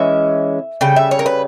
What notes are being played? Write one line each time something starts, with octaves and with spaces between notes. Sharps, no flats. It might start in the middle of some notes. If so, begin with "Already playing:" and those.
Already playing: E3 G#3 C#4 E5
C#3 G3 G5
E5
C#5
A#4
B4